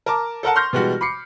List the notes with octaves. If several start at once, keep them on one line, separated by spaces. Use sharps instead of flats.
A#4 A5 A#5 D6
A4 A#4 F#5 A5
C6 C#6 F6 G6 A#6
B2 E3 G3 G#3 F#4
B5 D6 C7 C#7